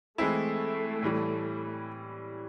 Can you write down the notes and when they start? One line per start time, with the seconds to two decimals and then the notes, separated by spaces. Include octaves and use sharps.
0.18 E3 G#3 A3 C4 E4
1.02 A2 E3 G3